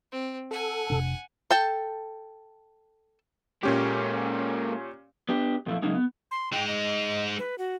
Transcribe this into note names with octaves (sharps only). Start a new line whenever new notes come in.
C4
A4 F#5 G#5
F1 C3 D4
A4 G5 A5
A#2 G#3 A#3 C#4 G4
B3 D4 G4
F2 A#2 F3 A3 E4
C#3 F#3 G#3 A#3 C#4 D#4
B3
C6
G#3 D#4 G5
D#5
B4
F#4